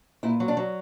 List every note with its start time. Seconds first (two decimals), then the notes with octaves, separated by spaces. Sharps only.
0.23 A#2 E4
0.40 F#3
0.48 D4
0.57 F#3